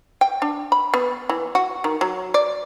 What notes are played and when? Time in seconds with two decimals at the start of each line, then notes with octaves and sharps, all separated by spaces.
0.21 G5
0.42 D4
0.72 B5
0.94 B3
1.29 E3
1.55 F#4
1.84 D#3
2.01 F#3
2.34 D5